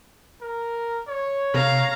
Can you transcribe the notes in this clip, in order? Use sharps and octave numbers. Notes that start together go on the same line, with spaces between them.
A#4
C#5
C3 F5 A#5